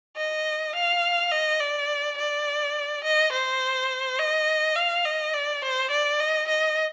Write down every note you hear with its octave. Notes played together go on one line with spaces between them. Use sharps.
D#5
F5
D#5
D5
D5
D#5
C5
D#5
F5
D#5
D5
C5
D5
D#5
D#5